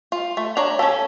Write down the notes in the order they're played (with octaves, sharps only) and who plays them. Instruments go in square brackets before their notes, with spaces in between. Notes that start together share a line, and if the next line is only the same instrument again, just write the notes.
[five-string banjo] F4
A3
D4 C#5 A#5
[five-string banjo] C#4 A4 [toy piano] F5 A5